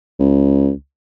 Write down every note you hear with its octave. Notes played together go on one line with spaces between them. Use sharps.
C#2